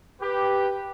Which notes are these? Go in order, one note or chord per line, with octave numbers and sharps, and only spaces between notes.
G4 B4